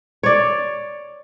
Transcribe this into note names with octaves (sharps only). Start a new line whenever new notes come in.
C#5 D5